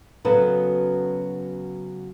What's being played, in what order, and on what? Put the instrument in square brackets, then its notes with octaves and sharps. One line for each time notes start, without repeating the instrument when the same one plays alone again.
[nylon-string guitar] C#3 F#3 B3 F#4 A4 B4